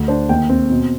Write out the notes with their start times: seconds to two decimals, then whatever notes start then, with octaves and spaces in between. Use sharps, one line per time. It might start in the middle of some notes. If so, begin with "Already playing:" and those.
Already playing: D2
0.08 D4 C5
0.29 D#2 G5
0.50 C4
0.70 B2